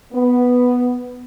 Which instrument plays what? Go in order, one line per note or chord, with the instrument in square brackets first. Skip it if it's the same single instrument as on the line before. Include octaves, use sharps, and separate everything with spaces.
[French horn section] B3